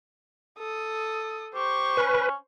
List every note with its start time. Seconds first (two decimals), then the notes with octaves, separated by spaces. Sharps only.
0.59 A4 D#6
1.55 G4 C5 C#6
1.97 C#4 B4